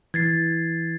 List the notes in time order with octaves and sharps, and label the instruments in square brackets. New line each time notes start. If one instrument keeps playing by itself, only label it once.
[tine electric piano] E3 [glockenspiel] G#6 A6 C7